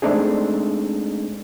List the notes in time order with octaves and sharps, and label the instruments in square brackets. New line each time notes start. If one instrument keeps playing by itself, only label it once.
[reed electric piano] G#3 A3 C4 D4 D#4 G#4